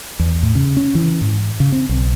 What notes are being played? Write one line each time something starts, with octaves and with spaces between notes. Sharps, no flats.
E2
A2
C#3
C#4
E3
G#2
C#3
C4
B1